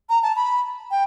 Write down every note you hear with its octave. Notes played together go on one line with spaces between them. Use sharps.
A#5
A5
B5
G5